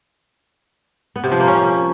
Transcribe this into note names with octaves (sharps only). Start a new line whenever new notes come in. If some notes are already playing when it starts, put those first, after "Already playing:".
B3
C3
F3
A#3
C#4